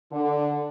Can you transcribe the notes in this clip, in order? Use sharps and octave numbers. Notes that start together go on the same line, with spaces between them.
D3